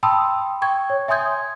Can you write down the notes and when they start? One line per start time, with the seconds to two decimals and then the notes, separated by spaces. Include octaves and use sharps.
0.03 G5 A5 B5 C6 D#6 E6
0.62 G5 C#6 G#6
0.90 C#5
1.08 E5 G#5 C6 D#6 G6 G#6